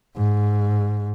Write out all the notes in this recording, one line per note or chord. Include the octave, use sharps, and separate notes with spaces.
G#2